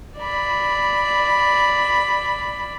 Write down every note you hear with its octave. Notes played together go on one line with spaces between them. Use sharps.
D5 B5